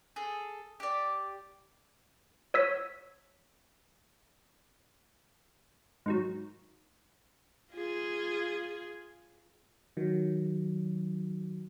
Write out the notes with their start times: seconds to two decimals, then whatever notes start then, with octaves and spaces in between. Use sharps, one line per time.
0.16 G#4 A4
0.80 G4 D5
2.54 C#5 E6 B6
6.06 G#2 D#3 F#3
7.73 F4 G#4
9.97 D#3 F#3